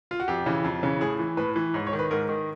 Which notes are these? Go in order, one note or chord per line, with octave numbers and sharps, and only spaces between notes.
F4
F#4
F2 G4
C#3 E3
F2
C#3 E3
A2 G#4
E3
A2 B4
E3
G#2 C#5
C#5
D#3
B4
G#2 A#4
D#3